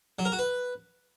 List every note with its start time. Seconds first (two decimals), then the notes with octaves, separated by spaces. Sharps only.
0.19 F#3
0.25 A#4
0.32 F#4
0.39 B4